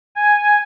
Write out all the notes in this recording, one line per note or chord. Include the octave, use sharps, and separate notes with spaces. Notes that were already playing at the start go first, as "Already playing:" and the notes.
G#5